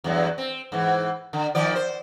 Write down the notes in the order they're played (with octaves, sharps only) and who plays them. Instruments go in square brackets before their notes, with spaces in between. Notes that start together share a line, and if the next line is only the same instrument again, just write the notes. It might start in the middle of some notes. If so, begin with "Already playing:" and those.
[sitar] E2 G2 F#3
C4
G#2 E3
D3
D#3 F3 D5
C5